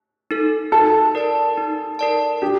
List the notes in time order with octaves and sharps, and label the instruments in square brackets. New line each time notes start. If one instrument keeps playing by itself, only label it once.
[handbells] D#4 A4
[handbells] D#4 [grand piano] A4
[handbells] A#4 D5 A5
D#4
A#4 D5 A5
[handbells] D4 [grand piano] G4